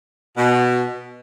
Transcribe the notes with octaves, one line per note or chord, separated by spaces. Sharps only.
B2